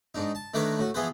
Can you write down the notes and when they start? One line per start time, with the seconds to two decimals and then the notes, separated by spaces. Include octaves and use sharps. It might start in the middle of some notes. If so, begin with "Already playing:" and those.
0.15 G#2 D4 D#4
0.35 A5
0.54 D#3 A3 D4 A#4 B4 C#5
0.79 A2 F#4
0.94 E3 F3 B3 G#4 B4 C5